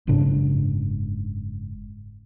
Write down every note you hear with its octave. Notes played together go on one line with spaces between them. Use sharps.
F#1 G#2 C#3 D4